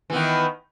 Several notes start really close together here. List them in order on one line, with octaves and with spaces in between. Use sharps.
E3 B3 D#3